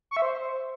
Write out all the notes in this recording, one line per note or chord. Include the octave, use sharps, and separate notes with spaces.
C#6
E5
C5